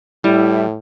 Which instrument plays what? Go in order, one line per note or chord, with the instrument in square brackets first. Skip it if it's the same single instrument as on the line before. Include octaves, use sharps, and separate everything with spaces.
[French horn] A2 [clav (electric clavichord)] G3 [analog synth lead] E4